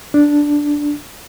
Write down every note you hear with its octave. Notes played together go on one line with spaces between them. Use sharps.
D4